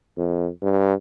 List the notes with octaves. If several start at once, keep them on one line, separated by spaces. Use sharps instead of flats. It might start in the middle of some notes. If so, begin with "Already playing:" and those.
F2
G2